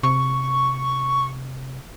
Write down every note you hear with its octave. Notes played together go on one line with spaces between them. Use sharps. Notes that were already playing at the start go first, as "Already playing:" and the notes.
C3 C#6